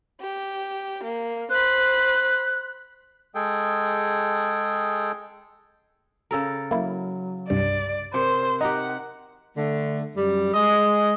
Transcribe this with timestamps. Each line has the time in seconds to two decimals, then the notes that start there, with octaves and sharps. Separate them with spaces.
0.20 G4
1.03 A#3
1.50 C5 B5 F#6
3.35 G#3 G#4 A4 G5
6.31 C#3 A4 A#4
6.71 F#3 A#3 E4
7.50 C2 G2 G3 D5
8.14 C3 A#4 C5
8.61 D#4 G4 D#5 F#5 A#5
9.56 D3 A3
10.16 F#2 G3
10.54 G#3 D#5